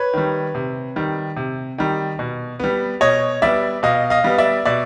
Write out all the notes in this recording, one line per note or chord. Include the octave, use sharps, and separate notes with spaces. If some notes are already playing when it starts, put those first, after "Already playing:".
Already playing: B4 C#5
D#3 G3
C3
D#3 G3
C3
D#3 G3
B2
G3 B3
B2 C#5 D#5
G3 B3 D5 E5
B2 D#5 F5
D#5 F5
G3 B3
D5 E5
B2 D5 E5